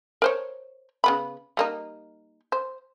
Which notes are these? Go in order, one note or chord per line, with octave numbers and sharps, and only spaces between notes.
A#4 C5 C#5
C#3 B3 B5
G3 A#3 D#4
C5